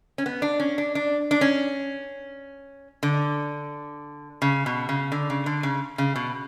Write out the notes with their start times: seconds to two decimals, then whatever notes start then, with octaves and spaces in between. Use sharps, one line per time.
0.18 C#4
0.26 B3
0.42 D4
0.60 C#4
0.78 D4
0.95 D4
1.31 D4
1.41 C#4
3.03 D3
4.42 C#3
4.66 B2
4.89 C#3
5.12 D3
5.30 C#3
5.46 D3
5.63 C#3
5.98 C#3
6.16 B2